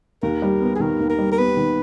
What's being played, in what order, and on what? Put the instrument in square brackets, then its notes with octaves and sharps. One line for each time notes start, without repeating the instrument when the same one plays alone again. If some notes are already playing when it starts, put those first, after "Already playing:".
[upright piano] D#2 [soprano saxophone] A#4
[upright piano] G3
B3
[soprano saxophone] G#4
[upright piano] D#3 [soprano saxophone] A#4
[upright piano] D#2
[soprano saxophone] A#4
[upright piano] G3
[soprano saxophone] A#4
[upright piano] B3 [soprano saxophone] B4
[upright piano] D#3